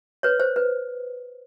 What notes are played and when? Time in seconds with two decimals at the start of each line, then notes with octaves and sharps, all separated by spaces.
0.23 B4 C#5
0.40 C5
0.56 B4